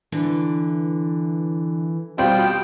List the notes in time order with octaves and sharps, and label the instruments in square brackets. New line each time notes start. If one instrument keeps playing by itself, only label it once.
[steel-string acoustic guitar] D3 [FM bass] E3
[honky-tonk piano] B2 G3 C4 [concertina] F4 G5